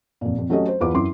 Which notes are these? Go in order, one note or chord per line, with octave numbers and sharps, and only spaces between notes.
F2 A#2
F2
F#3 A3 C#4 G4 A4 D#5
C5
E2 F4 B4 D6
F#2 E4 C6 D6